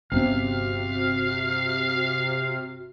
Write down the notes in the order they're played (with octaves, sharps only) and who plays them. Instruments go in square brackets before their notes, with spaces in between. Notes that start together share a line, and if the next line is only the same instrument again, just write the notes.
[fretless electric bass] G1 B3 C#4 [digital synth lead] C3 [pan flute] F#4 [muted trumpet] F5